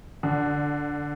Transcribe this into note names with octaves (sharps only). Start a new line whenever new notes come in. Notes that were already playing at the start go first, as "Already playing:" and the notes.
D3